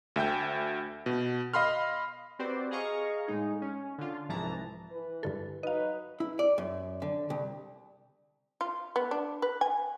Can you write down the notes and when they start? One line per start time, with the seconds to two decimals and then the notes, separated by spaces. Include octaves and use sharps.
0.16 D2 E5 G5 G6
1.06 B2
1.54 D#5 F5 B5 C6 F6
2.39 C4 F#4 G4 B4 C5 D5
2.71 G#4 D#5 F5 A#5 C#6
3.27 A2 G#3 D#4 G#4
3.62 C#4
3.98 D3 F4
4.29 C2 G#2 E3 F3 A5 A#5
4.91 E3 B4
5.23 G2 D3 A4
5.63 F#3 D#4 B4 D#5 F5
6.20 E4
6.39 D5
6.58 F#2
7.02 D3
7.30 C2
8.61 F4
8.96 B3
9.11 D4
9.42 B4
9.61 G#5